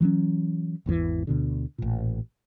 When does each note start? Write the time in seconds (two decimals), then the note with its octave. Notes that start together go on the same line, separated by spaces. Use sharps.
0.01 E3 F#3 A#3 C#4
0.86 G#1 E2 B2 E3
1.27 D2 B2 D3
1.78 A1 A#2